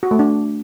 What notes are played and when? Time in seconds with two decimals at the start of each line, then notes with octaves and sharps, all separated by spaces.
0.03 F#4
0.11 A3
0.19 D4